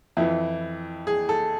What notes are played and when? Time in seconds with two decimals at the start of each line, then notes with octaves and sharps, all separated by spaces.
0.17 F2 E3 E4
1.07 G#4
1.29 A4